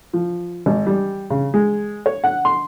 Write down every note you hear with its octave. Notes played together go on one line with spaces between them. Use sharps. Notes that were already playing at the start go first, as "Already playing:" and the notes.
F3
G#1
G3
C#3
G#3
C#5
F#5
C6